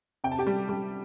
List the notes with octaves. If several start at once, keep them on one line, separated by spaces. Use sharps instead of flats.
C3 G5
A5
G4 G5
G3
G3